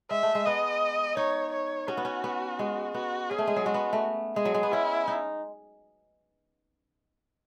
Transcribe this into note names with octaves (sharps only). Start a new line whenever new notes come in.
G#3 E5
A3
G#3
B3 D#5
D#4 C#5
C#5
C#4 F#4
B3
C#4
B3
G#3
B3 F#4
C#4 G#4
A3
G#3
F#3
G#3 F#4
B3
A3
G#3 G#4
F#3
G#3
B3
C#4 E4
D#4